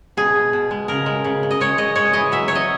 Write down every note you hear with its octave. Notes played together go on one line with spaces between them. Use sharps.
B2 G#4
B2
B2
G#3
C#3 A#4
G#3
C#3
C#3
D#5
G#3 C#5
G#3 D#5
G#3 C#5
E3 D#5
F#3 E5
F#3 C#5
D#5